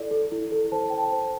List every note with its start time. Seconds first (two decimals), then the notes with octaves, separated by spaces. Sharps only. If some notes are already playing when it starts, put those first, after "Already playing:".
Already playing: E4 A4 D5
0.11 A4
0.32 E4
0.52 A4
0.72 C5 A5
0.90 C5 G5
0.99 A5
1.12 C5